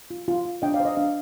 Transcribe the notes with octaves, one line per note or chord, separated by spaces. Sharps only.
F4
F4
F4
D4 D#5 G5
D5 F5
C5
D#5
D4 D5 F5